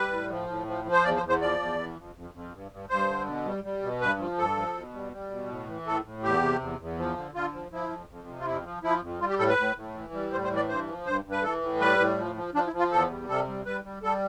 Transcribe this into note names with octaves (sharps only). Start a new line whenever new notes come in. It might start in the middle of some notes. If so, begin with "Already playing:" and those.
Already playing: G3 B4
A2
F3
A2
F3
F3
C5
E2 D5
C5
E2
C5
F3 D5
E2
E3
F2
F2
F2
G2
G2
G2 C5
D3
B2
G3
G3
B2
G2 B4
F3
G2 A4
F3
B2
G3
G3
B2
A2
E3
A2 A4
A2
E2 G4
C3
E2
E2
F3
D3
D3 F4
F3
F3 E4
F2
F2
C3
F4
F2 E4
F3
F3 E4
F2
G3 F4
G4
A2 A4
B4
A2
A2
E3
G3
A2 C5
C5
E3
D5
G2 C5
F3
G2 C5
G2
B4
E3 A4
A2
G3 B4
A2
F3
F3
F3 D4
E4
F3
F4
E2 A4
G3
C3 A4
G3
G3 B4
G3
G3 A4